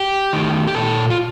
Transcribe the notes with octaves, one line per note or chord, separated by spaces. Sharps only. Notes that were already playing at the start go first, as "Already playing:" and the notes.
Already playing: G4
D#3 A3
G4
A#2 A4
F4